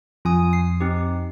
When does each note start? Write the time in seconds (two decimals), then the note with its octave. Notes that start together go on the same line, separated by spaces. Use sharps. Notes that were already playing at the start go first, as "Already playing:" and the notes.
0.25 F2 F4 G#5 D#6
0.53 C7
0.80 C4 D#4 G4